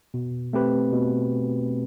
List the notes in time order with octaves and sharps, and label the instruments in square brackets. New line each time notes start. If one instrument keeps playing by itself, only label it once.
[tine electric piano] B2
A3 C4 G4 B4
B2